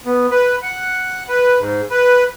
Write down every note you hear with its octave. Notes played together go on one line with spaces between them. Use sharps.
B3
B4
F#5
B4
G#2
B4